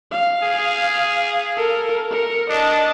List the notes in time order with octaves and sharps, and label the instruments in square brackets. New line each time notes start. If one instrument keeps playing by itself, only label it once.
[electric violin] F5
[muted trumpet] G#4
[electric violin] A4 A#4
A#4 C#7
[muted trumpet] D4 [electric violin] D#5 A5